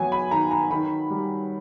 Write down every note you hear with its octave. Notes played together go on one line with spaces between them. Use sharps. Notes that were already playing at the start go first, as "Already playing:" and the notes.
Already playing: F#3 B3 G#5
B5
D#3 A#5
A#5
D#3 B5
G3